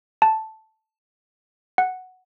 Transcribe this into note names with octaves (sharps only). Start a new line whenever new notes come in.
A5
F#5